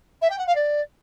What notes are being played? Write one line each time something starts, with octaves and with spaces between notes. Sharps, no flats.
E5
G5
F#5
F5
D5